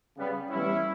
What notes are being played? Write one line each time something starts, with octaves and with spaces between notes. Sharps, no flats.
C#3 G3 B3
A2 E3 G3 B3 C#4 E4